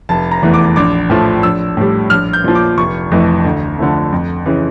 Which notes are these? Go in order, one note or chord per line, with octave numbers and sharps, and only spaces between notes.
F1 A5
A#5
E2 E3 A3
D6
A#1 D6
A2 F3 A3
A#1 E6
A2 G3
A#1 F6
G6
A#2 F3
D6
F1 C#6
F2 E3 A3
D2
D3 F3 A3
F2
C#3 E3